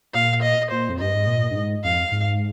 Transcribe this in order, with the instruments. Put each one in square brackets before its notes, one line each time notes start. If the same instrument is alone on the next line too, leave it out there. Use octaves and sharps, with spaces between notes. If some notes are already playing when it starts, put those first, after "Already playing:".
[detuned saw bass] A#2 [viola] F5
[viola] D#5
[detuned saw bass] A#2 [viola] C5
[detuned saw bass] F2
[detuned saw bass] G2 [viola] D#5
[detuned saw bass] G#2
A#2
G2
G#2
[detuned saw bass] F2 [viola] F5
[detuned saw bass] G#2